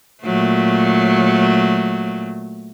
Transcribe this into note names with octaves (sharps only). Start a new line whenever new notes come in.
A#2 F#3 A3